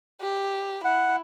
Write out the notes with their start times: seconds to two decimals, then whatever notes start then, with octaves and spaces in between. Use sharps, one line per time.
0.22 G4
0.85 E4 F#5